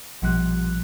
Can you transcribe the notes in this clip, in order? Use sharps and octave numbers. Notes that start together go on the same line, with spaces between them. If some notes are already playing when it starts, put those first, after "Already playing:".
A#1 B2 F3 G3 F#6